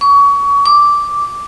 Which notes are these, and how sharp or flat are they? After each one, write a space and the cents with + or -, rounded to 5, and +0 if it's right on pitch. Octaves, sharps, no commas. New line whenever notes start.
C#6 +30
D6 -5